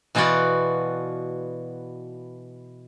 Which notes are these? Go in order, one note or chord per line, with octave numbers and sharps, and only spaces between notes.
B2 E3 B3 F4 F#4 D5